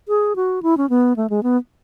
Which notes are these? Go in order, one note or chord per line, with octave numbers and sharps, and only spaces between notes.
G#4
F#4
E4
C#4
B3
A3
G#3
B3